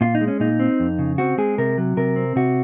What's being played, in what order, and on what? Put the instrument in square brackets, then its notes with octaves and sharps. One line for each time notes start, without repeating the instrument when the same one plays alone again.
[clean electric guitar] A#2 F4
D#4
G#3
C#4
A#2 D#4
C4
F2
C#3
C4 F#4
G#3 G#4
C3 A#4
F#3
C3 A#4
C4
C3 F#4